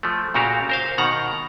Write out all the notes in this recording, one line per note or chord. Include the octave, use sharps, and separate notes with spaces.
F3 A3
A#2 C#3 F#4 G4 A#4 F5
A#4 C5 F5
B2 D#3 F#5 A#5